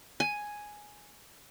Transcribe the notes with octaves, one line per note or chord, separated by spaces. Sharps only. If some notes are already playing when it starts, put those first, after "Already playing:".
G#5